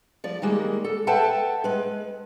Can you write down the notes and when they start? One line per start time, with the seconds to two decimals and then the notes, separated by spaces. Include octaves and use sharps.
0.24 F3 D5
0.42 D#3 G3 G#3 A#3
0.84 A4
1.07 A4 B4 E5 F#5 G5 A5
1.64 G#3 B4